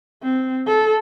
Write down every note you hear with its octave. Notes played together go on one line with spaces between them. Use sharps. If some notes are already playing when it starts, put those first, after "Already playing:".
C4
A4